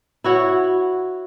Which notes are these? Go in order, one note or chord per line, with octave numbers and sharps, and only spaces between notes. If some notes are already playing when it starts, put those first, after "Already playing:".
E4 F#4 C#5